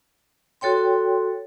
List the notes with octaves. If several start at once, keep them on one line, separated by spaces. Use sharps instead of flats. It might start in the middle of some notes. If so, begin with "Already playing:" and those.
F#4 A4 C#5 G5 C6